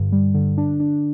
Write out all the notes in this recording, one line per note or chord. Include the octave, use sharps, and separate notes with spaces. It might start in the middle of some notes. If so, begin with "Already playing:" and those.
Already playing: G2 D3
G3
D3
D4
D4